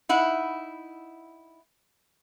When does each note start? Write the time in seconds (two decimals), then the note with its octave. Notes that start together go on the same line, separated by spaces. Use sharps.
0.09 D#4 E4 F#5